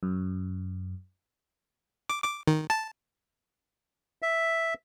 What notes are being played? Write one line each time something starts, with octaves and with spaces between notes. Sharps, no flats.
F#2
D6
D6
D#3
A5
E5